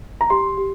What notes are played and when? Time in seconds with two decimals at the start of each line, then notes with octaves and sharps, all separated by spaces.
0.21 A#5
0.30 G4 C6
0.57 G4